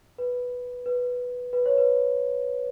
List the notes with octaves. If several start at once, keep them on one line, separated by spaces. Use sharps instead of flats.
B4
B4
B4
C#5
B4